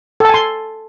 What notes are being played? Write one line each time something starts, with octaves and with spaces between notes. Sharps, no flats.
A4 G#5 A5 C6